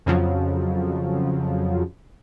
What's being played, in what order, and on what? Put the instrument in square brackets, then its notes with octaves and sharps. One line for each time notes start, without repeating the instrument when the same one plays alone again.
[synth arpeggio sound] F2 C#3 F3 F#3